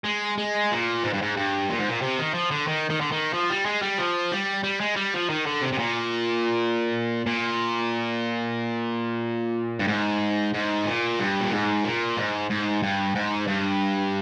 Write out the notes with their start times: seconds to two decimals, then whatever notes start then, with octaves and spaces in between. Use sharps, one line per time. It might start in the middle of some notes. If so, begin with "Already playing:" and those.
0.05 G#3
0.38 G#3
0.71 A#2
1.03 G#2
1.13 G2
1.22 G#2
1.37 G2
1.69 A#2
1.79 G#2
1.89 A#2
2.01 C3
2.18 D#3
2.34 F3
2.51 D3
2.67 D#3
2.90 D#3
3.01 D3
3.12 D#3
3.33 F3
3.50 G3
3.65 G#3
3.82 G3
3.98 F3
4.32 G3
4.64 G3
4.80 G#3
4.96 G3
5.14 F3
5.30 D#3
5.46 D3
5.62 C3
5.73 C3
5.79 A#2
7.26 A#2
9.79 G2
9.88 G#2
10.54 G#2
10.86 A#2
11.19 G2
11.41 A#2
11.52 G#2
11.84 A#2
12.17 G#2
12.50 G#2
12.83 G2
13.15 G#2
13.48 G2